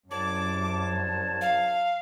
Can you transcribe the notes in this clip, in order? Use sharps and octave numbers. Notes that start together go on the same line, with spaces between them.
C2 F#2 C#5 A5 D6
F5